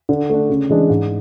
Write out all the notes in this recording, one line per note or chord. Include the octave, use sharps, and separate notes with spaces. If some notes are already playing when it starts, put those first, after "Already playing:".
D3
A3 D4
C#3
E3 G#3 D4
G#2